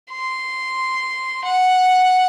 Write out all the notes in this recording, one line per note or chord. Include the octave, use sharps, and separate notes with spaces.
C6
F#5